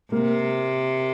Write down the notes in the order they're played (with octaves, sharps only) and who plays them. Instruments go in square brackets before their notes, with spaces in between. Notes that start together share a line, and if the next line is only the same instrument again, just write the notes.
[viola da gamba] C3 [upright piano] A#3